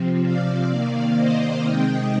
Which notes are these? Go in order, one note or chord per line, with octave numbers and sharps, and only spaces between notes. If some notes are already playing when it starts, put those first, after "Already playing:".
Already playing: C3 F3 C4
D5 F5
C3 D#3 A#3
C5 D#5
C3 D#3 G#3 C4 D#5 G5